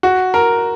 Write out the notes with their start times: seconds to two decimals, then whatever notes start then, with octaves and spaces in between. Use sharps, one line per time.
0.03 F#4
0.34 A#4